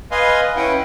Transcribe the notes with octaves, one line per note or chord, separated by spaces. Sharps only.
B4 D#5 F5 G#5 C6
C#4 E4 B4 F#5 G5